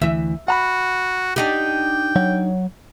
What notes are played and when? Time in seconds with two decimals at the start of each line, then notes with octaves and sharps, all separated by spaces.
0.02 D2 E3 E5
0.48 F#4 F#5 A#5 B5
1.36 D4 D#4 G4 G5
2.16 F#3 C#5 F#5